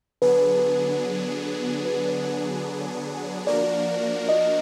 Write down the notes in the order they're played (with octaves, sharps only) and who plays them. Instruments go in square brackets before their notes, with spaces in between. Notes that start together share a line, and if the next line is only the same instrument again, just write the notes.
[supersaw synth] D3 F#3 B3 D4 G#4 [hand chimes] B4
[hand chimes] B4
[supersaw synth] F3 A#3 D4 F#4 A#4 [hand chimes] D5
[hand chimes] D#5